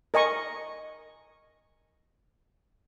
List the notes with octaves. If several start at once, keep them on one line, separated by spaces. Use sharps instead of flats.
A#4 D#5 G#5 C#6